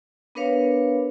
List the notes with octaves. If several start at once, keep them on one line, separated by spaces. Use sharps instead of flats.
B3 D4 A#4 B4 C#5 F5